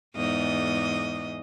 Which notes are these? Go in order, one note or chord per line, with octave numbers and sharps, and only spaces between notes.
E2 G#2 D#5